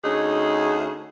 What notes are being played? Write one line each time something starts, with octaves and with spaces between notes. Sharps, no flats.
D2 C#4 D#4 G#4